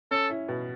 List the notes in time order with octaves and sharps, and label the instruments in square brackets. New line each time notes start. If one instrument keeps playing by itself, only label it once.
[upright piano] C#4 [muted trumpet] A4
[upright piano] E4
B2